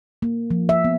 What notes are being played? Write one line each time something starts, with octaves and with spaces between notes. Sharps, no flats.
A#3
F3
E5
B3